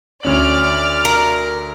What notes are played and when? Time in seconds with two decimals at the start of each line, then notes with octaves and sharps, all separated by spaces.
0.23 D2 C#4 D5 F6 F#7
1.05 A#4